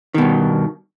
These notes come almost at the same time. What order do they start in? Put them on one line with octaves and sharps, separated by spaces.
D#3 B2 G2